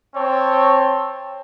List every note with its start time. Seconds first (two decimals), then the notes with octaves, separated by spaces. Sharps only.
0.15 C4 C#5 A5